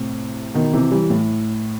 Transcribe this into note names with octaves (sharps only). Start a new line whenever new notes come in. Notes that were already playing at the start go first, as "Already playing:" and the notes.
Already playing: A2 C3
B2 D#3
C3 E3
E3 G3
A2